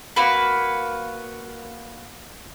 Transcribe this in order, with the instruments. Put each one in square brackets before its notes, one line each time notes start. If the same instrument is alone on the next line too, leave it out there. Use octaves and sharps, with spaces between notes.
[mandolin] A#3 F#4 B4